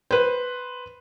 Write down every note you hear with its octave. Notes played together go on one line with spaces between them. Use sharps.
B4 C5